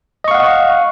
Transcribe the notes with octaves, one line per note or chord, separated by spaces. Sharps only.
D#5 F5 F#5 C#6